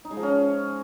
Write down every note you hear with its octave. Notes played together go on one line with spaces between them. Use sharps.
D#4
G#3
F3
C#4